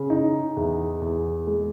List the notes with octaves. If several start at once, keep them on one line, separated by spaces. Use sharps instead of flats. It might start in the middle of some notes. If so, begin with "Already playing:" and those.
Already playing: C#3
D#4
E2
E2
G#3